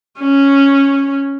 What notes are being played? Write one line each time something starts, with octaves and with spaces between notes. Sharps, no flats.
C#4